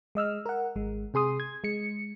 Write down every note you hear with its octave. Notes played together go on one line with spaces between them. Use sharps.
G#3 D#5 E6 F6
A#4 F#5
G#1 G#3
C3 G#4 C6 D#6
G#6
G#3 C#7